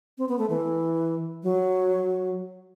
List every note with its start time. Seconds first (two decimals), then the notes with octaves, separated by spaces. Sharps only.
0.18 C4
0.29 B3
0.39 A3
0.50 E3
1.43 F#3